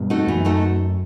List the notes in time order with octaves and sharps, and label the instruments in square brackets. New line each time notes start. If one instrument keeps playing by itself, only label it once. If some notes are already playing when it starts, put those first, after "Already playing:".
Already playing: [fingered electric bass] G2 B2
[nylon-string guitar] A3 D#4 F#4 A4
[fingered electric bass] F#2 [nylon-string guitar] E3
[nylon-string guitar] A3 D#4 F#4 A4